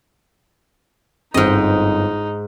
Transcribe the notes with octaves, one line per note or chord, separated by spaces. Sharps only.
G1 G#2 C4 D#4 D#5